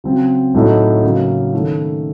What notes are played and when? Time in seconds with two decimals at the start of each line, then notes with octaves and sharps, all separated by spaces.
0.04 C#3 F#3 C4
0.54 A2 F#3 A3 D#4
1.03 C#3 F#3 A#3
1.54 D#3 A3 C#4